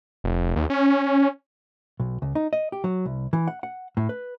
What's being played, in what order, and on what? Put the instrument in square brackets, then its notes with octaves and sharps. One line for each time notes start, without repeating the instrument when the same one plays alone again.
[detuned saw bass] F1
D#2
C#4
[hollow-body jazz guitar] B1
C#2
D#4
D#5
G4
F#3
C2
E3
F#5
F#5
A2
B4